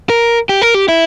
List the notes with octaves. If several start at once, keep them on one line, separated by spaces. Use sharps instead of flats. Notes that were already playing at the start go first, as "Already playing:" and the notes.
A#4
G4
A#4
G4
E4